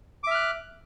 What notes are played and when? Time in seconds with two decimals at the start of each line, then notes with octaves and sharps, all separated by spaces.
0.24 D6
0.27 E5
0.31 F6
0.35 F#6